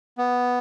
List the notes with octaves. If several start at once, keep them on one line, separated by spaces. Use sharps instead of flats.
B3